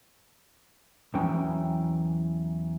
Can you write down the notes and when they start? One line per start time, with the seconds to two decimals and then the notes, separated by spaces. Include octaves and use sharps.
1.14 E2 E3 F#3 C#4 G5 A#5